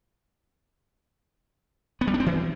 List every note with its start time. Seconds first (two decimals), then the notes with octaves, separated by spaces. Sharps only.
2.01 B3
2.07 G3
2.14 D4
2.20 C4
2.26 E3